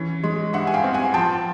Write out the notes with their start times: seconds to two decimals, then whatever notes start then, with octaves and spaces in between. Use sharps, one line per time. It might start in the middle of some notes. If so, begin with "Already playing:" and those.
Already playing: E3 C#4
0.24 G#3
0.53 G2 E5 F#5
0.67 G#5
0.74 F5 G5
0.84 C4
0.94 F#5 G#5
1.14 F3 G5 A5